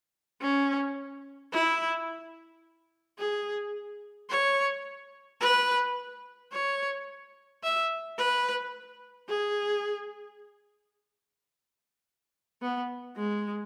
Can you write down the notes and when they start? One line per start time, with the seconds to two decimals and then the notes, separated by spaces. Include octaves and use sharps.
0.42 C#4
1.52 E4
3.18 G#4
4.30 C#5
5.41 B4
6.52 C#5
7.63 E5
8.18 B4
9.29 G#4
12.62 B3
13.17 G#3